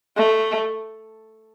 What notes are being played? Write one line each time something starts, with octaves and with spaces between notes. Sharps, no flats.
A3